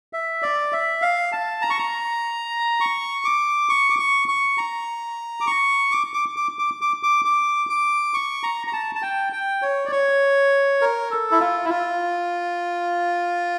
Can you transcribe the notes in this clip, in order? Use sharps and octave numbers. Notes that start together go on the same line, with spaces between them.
E5
D5
E5
F5
A5
A#5
C#6
A#5
C#6
D6
C#6
D6
C#6
C#6
A#5
D6
C#6
D6
D6
D6
D6
D6
D6
D6
D6
C#6
A#5
A#5
A5
A5
G5
G5
C#5
D5
C#5
A#4
A4
E4
F4
E4
F4